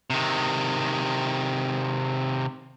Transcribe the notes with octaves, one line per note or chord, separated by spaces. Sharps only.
C3 D#3